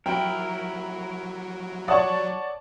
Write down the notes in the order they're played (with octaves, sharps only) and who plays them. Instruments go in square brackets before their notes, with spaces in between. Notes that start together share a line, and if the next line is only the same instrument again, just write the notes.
[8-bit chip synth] F#3 [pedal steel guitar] E4 A#4 [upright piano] G5
[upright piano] C#5 F#5 D#6 [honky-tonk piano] D5 A5 C#6